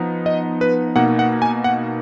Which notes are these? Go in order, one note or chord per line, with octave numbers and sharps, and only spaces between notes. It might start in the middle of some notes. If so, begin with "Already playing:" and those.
Already playing: F3 B3 D#4
D#5
B4
B2 A#3 D#4 F#5
F#5
G#5
F#5